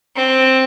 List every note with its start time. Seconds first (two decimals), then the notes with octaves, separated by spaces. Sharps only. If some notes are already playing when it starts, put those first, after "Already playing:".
0.16 C4